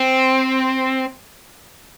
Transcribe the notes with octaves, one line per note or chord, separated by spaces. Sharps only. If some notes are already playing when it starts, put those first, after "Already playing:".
Already playing: C4